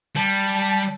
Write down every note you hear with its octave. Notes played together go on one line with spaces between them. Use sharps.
G3 A5